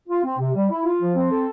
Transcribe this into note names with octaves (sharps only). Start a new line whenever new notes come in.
F4
C4
C3
G3
E4
F4
F3
C4
A4